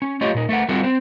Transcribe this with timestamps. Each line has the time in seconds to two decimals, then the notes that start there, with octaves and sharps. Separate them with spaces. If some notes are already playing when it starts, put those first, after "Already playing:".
0.02 C#4
0.21 A3 F4 G4 C#5 D#5
0.35 A#2 D#4
0.49 A3 A4 B4 F#5
0.69 G3 C4 F4 F#4 G#4 A4
0.83 C4 C5